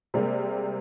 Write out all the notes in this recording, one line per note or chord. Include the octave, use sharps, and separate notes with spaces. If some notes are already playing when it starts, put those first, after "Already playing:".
C3 G3 G#3 A#3